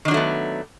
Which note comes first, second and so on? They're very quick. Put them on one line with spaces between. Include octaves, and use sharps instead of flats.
D#3 D4 F#3 A3 B3